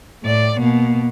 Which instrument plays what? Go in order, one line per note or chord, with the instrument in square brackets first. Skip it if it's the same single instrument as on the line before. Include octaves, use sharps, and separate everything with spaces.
[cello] A2 D5
B2 A#3